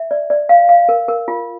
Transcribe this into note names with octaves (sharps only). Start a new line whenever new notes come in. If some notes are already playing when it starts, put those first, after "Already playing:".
Already playing: E5
D5
D5
F5
F5
A#4
A#4
F4